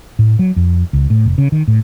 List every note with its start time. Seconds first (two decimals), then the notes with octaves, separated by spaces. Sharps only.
0.19 A2
0.39 F#3
0.56 F2
0.93 C#2
1.10 A2
1.26 F1
1.38 C#3
1.52 D#3
1.68 A2